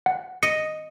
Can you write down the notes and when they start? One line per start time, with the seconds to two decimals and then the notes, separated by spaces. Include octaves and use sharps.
0.06 F#5
0.43 D#5 C#7